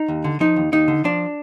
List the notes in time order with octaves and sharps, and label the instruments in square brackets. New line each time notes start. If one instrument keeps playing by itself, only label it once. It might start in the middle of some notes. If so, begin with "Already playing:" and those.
Already playing: [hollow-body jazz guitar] D#4
D#2
D3
F3 D#4
D#2
D#2 D#4
D3
F3 D4